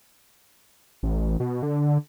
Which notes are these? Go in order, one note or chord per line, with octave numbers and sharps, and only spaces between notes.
A1
B2
D3